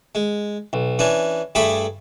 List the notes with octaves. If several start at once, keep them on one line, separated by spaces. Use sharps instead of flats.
G#3
B1
E3 C#4 D4
G2 A3 G#4 B5 D6